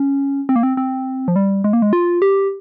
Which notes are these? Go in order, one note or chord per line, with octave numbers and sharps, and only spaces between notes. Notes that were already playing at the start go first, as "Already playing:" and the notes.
Already playing: C#4
C4
A#3
C4
C4
F3
G3
G#3
A#3
G#3
F4
G4